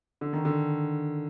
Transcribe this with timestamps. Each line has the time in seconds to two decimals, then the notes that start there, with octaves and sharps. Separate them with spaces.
0.21 D3
0.33 D#3
0.45 D3